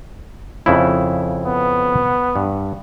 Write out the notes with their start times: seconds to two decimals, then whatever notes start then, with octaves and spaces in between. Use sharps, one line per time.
0.66 F2 C#3 E4
1.45 B3
2.36 G2